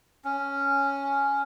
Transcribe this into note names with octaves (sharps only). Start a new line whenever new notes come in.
C#4